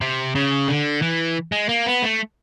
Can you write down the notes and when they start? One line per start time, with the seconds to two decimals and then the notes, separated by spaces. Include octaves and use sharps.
0.01 C3
0.35 C#3
0.68 D3
1.02 E3
1.52 G#3
1.69 A#3
1.86 B3
2.02 A3